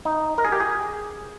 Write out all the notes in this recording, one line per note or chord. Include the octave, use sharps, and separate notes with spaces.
D#4
A#4
G#4
G4
G#4